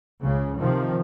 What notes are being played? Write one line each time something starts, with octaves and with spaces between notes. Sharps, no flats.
C#2 C#3
C3 D#3 F3